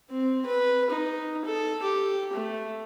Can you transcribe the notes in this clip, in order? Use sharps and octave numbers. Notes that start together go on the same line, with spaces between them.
C4
B4
D#4
A4
G4
A3